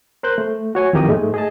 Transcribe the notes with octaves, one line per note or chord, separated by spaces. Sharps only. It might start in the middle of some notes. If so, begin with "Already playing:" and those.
A#4 C5 F#6 G6
A3
F#4 C#5 G#5
F2 D#3 E4 G4 A#4 D#6
G#2 G#3 A3
G#4 D#5 A5